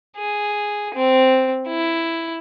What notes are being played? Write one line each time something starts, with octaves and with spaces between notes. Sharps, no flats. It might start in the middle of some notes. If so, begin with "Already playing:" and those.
G#4
C4
E4